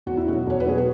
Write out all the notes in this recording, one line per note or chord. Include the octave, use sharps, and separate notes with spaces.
E2 F#4
E4
B2 F#3 F#4
E2 C#5
B4
B2 F#3 G#4
F#4